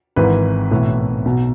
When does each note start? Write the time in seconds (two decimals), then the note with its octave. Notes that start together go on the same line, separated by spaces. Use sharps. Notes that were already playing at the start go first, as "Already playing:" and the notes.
0.16 G#1 G#2 E3 B4
0.71 B1 A2 E3
1.25 B1 B2